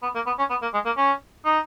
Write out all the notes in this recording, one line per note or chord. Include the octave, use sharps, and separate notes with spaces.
B3
A#3
B3
C#4
B3
A#3
G#3
A#3
C#4
D#4